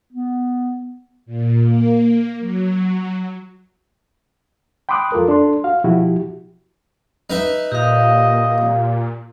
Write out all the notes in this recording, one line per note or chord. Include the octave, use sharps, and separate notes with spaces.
B3
A#2
A#3
F#3
G5 B5 C6 D6 D#6 F#6
F2 F4 A4 A#4
D4 A4 C6
F#4 F5
B2 F3 E4 F#4 G4
D#4 B4 E5
A#2 G4 D#5 F5